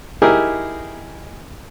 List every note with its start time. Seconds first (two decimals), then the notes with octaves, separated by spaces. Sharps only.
0.22 D#4 E4 G4 G#4 A#4